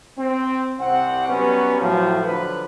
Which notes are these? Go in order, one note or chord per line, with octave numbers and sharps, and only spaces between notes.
C4
C2 C4 F#5
F#3 G3 B3 C#4 B4
A2 F3 F#3
D3 F3 F#3 B4